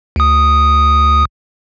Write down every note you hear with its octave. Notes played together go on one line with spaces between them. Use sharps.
D2 D#6